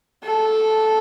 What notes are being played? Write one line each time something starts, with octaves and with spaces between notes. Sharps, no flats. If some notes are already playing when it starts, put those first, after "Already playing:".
A4